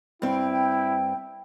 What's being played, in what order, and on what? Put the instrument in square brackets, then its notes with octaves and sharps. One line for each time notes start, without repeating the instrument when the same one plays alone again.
[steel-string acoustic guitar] G2 C4 [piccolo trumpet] E4 [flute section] G5